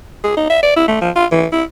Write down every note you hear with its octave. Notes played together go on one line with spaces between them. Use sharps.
G#4
D#4
E5
D5
E4
A3
F3
F4
E3
E4